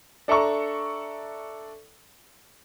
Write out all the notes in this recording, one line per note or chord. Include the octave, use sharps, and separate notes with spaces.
D4 A4 E5 A#5 C#6